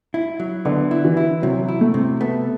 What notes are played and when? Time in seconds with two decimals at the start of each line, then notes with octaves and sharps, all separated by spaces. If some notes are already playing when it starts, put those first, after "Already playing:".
0.14 E4
0.40 F#3
0.65 D3 B3
0.91 E4
1.05 E3
1.17 E4
1.42 C3 F#3
1.68 E4
1.81 A3
1.94 C3
2.21 A3 B3